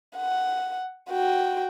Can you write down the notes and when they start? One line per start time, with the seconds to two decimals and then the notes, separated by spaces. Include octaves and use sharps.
0.17 F#5
1.10 F#4 G5